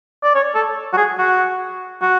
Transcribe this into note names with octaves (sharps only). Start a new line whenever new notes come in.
D5
C#5
A4
F#4
G#4
F#4
F#4